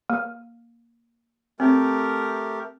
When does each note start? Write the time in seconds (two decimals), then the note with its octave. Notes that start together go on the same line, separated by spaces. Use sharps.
0.10 A#3
1.60 A3 C4 G4 A#4